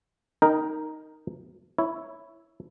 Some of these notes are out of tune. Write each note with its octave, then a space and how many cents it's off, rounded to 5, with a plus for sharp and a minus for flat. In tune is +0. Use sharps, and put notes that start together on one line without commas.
D#4 +0 A#4 +0 G5 +0
E4 +0 C#5 +0